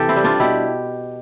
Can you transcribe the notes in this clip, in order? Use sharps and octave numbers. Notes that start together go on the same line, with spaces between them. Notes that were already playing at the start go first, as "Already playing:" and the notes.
Already playing: C3 E3 G4 A4
C4 E4
G3
D4 F4
B2 E4 G4